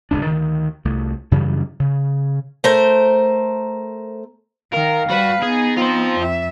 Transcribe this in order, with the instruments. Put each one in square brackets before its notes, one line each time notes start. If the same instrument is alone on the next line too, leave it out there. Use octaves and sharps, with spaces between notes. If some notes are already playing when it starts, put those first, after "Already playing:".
[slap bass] D1 C#2 D4
D2 D#3
C2 A3
F#2 C#3 E3 G3
C#3
[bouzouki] A3 A#4 C5
[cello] D#3 [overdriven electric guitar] A#4 [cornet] F5
[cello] G3 B4 [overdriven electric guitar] F#4
[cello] B3 D#4 [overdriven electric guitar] G#4
[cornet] C4 [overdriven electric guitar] F4 C5
[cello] F2 E5